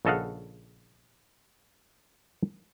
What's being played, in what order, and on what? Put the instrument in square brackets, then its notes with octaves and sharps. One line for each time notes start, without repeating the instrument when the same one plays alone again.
[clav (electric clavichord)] A#1 C#3 A4 D#5 F5 F#5